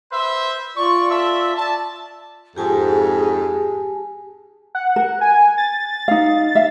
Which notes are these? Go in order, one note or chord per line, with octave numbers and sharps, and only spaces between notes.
B4 C5 E5
F4 D5 C#6
A4 E5
A5
F2 G#2 G4 G#4 G#5 A5
F#5
A#4
G#5
A6
D#4 F5
E5 F5